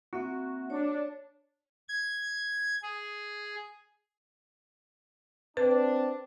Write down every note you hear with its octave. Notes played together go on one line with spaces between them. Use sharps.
A#3 C4 F#4 E5
D4 C#5
G#6
G#4
C4 D4 B4